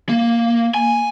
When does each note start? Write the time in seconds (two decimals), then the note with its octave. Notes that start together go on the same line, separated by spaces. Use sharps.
0.09 A#3
0.74 G#5